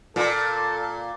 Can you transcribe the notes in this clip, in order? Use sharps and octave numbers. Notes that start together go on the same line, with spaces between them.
A#2 A4